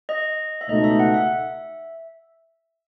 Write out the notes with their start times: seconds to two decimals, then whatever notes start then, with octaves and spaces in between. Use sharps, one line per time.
0.09 D#5
0.61 E5
0.68 C#2 B2 A3 D#4 D#5
0.84 E5
0.99 F#5
1.14 E5